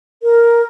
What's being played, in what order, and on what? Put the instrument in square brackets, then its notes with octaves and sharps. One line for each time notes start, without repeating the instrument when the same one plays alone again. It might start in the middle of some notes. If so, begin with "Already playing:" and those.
[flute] A#4